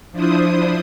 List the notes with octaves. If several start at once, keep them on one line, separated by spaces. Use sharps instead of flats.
F3 D4 E4 C5 D#6